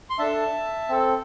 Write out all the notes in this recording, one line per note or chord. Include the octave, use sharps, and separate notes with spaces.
C6
D4 A4 E5 A5
C4 A4